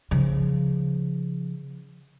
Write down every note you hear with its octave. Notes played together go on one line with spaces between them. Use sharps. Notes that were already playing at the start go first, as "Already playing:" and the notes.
C#3 F3